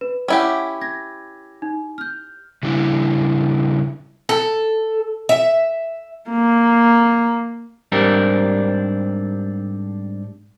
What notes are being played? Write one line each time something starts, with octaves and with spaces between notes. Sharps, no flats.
B4
C#4 E4 G4 C#5 F#5
G#6 A#6
D#4
F6 G6
C#3 G3 D4 E4
A4
E5
A#3
G#2 G3 C4 D4 A#4